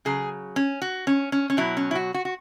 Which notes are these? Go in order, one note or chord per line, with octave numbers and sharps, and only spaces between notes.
C#3 F#3 G#4
C#4
F#4
C#4
C#4
C#4
B2 F#3 E4
C#4
E4
F#4
F#4
F#4